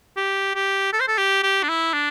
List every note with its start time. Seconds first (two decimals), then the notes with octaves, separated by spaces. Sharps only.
0.17 G4
0.55 G4
0.93 A4
1.00 C5
1.08 A4
1.18 G4
1.43 G4
1.63 D4
1.69 E4
1.94 D4